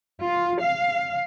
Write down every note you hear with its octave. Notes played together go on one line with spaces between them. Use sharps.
F4
F5